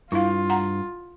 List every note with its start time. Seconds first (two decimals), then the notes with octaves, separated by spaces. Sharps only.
0.12 G2 E4 F4 F5
0.50 F#5 A#5